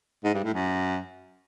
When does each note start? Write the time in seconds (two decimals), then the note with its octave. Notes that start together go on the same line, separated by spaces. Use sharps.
0.24 G#2
0.34 G2
0.44 A2
0.54 F#2